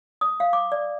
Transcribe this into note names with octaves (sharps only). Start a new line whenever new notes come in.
D#6
F5
D6
D5